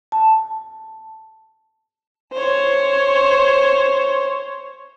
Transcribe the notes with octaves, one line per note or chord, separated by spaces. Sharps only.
A5
C5 C#5